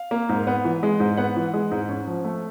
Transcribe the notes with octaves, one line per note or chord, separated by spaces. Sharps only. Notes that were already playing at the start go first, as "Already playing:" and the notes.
Already playing: F5
A#3
G#2
B3
E3
G#3
G#2
B3 F#5
E3
G#3
G#2
C#4
F3
A3